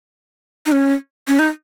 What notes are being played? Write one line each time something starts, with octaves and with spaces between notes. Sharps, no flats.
D#4
C#4
C#4
D#4